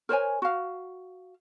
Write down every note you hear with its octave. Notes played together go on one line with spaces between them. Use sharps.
A#4 C5 C#5 G#5
F#4 F5